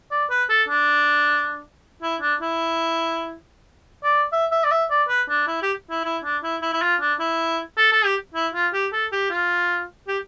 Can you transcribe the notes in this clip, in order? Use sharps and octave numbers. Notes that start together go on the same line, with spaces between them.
D5
B4
A4
D4
E4
D4
E4
D5
E5
E5
D5
E5
D5
B4
D4
E4
G4
E4
E4
D4
E4
E4
E4
F4
D4
E4
A4
A4
G4
E4
F4
G4
A4
G4
F4
G4